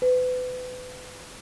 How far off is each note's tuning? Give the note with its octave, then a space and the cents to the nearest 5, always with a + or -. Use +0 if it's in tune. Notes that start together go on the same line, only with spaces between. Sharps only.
B4 +35